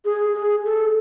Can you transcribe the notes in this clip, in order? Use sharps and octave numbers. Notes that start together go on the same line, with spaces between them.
G#4
G#4
A4